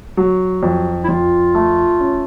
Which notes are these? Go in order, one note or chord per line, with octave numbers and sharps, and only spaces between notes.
F#3
F2
E4
F2 F4
A3
C#4